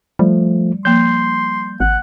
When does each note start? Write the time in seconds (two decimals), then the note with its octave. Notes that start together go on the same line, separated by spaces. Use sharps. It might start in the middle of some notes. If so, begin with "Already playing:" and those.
0.19 F3 G3 A3
0.85 F3 A#3 C6 G6
1.80 G#1 F#5